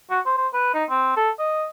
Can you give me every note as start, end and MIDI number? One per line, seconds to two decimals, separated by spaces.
0.11 0.20 66
0.25 0.33 72
0.37 0.48 72
0.54 0.74 71
0.74 0.84 63
0.89 1.15 60
1.17 1.30 69
1.39 1.65 75